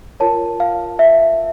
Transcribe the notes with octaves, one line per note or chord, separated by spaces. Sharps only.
F4 A#4 C#5 A5
F5
E5